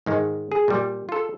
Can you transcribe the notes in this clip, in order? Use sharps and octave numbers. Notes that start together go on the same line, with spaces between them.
G#2 D#3 G#3
G#4
A#2 G3
F4 A4